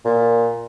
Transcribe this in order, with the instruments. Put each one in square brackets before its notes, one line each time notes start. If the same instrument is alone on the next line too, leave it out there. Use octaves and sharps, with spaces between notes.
[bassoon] A#2